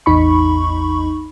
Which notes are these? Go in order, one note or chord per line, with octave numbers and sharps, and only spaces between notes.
A1 E2 D#4 B5 C#6